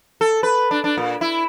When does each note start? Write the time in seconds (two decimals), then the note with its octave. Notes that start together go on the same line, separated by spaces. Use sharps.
0.21 A4
0.43 B4
0.71 D4
0.84 D4
0.98 A#2
1.21 E4